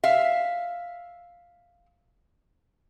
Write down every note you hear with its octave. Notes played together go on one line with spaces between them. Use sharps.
E5 F5